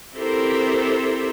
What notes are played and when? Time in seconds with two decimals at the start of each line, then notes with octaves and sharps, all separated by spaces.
0.16 C4 E4 G4 A4 A#4 C5